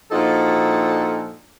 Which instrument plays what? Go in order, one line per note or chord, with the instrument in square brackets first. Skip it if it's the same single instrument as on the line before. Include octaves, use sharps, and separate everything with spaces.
[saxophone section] A#2 F3 D4 D#4 F#4 A4